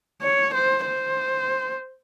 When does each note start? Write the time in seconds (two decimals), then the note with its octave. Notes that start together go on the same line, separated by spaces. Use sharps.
0.22 C#5
0.54 C5
0.86 C5